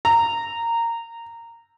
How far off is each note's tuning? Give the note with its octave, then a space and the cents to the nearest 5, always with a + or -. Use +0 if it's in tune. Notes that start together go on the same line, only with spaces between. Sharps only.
A#5 -15